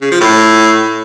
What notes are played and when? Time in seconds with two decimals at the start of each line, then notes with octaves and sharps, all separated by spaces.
0.02 C#3
0.11 F3
0.21 A2